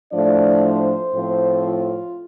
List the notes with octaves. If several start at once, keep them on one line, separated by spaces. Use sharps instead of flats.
A2 F3 A3 D4 D5
C5
A2 F3 C4
F4